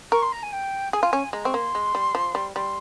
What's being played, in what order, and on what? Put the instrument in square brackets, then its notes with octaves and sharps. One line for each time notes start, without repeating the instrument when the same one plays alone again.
[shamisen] A#4 [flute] C#6
[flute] C6
A#5
G#5
G5
[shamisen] G#4 [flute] G#5
[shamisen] F4
C#4
[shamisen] G#3 [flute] A#5
[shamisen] C4 [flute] C#6
[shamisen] A#3 [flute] C6
[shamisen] G#3
G3
F3
G3
[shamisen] G3 [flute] C6